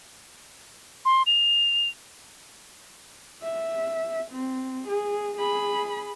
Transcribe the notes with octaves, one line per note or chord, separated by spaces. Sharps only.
C6
F7
E5
C4
G#4
G#4 B5